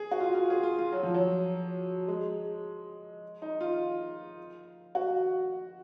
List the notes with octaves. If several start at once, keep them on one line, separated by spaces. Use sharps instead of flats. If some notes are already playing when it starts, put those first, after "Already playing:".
Already playing: G#4
F#4
F4
F4
G#4
F4
F4
F#3
F3
F#3
G#3
D#4
F4
F#4